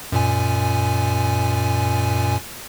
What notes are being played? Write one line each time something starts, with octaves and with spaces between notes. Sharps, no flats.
F#2 A#2 G#5